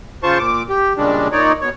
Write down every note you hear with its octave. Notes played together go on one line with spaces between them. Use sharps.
C#3 F4 C5 A5 C#6
A#2 D6
G4
A#2 C#3 G3 G#3 D4
A#2 D#4 C#5 D5
B2 C#5